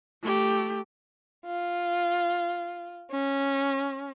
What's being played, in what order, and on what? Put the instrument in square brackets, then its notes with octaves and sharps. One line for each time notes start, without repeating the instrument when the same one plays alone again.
[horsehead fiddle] A3 G4
[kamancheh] F4
C#4